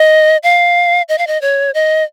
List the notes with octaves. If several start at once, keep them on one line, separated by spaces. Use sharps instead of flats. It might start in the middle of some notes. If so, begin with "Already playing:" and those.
Already playing: D#5
F5
D#5
F5
D#5
C#5
D#5